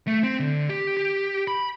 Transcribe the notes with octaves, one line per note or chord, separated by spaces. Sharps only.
A3
C4
D3
G4
G4
B5